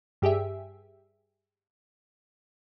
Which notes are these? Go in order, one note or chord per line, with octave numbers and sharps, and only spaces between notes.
G2 G4 G#4 E5